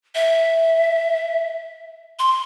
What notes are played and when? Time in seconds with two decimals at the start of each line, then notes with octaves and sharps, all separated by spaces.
0.15 E5
2.19 C6